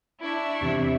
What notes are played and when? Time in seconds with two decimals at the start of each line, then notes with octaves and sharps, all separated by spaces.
0.20 D4 E4 D5 E5 C#6
0.61 E2 C3 E3